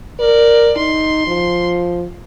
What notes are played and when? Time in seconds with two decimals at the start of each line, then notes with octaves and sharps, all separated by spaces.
0.19 A#4 D5
0.77 D#4 C6
1.27 F3